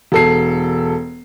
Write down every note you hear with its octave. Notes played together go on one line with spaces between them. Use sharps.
E1 A4 C7